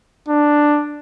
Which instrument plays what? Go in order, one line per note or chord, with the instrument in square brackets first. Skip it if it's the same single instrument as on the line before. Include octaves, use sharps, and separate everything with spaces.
[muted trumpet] D4